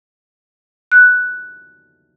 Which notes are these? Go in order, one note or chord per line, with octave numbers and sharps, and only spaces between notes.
F#6